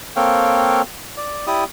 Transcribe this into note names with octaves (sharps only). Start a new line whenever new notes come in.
A#3 C4 A4 C#5 F5 G5
D5
E4 G4 D5 D#6